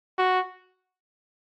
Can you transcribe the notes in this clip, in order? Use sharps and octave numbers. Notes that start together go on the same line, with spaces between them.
F#4